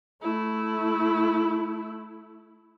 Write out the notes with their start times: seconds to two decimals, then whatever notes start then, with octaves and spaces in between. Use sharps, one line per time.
0.22 A3 E4